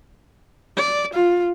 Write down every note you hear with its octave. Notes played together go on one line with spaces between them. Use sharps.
D5
F4